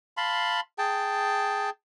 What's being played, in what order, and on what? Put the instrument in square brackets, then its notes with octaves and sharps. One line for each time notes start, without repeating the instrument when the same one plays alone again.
[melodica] F5 A5 B5 C6
G#4 G5 A5